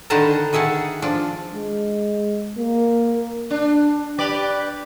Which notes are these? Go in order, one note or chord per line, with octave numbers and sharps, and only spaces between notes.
D3 D#3 B4 C5 A5 A#5
D#3 G#4 E5 F#5 A5
F3 D4
G#3
A#3
D4
G4 B4 D5